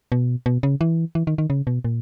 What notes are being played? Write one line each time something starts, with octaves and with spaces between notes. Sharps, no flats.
B2
B2
C#3
E3
E3
D#3
D#3
C#3
B2
A#2